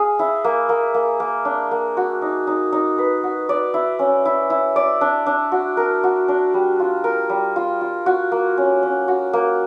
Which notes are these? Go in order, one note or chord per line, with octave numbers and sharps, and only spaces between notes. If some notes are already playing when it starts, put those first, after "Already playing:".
Already playing: G#4 F5
E4
A#3
A#3
A#3
A#3
D4
A#3
F#4
D#4
D#4
D#4
B4
F#4
D5
E4
C#4
E4
E4
D5
D4
D4
F#4
A#4
F#4
D4
G3
F4
A#4
G3
F4
F4
F#4
A#3
C#4
C#4
F#4
A#3